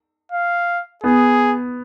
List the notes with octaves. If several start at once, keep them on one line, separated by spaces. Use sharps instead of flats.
F5
B3 G#4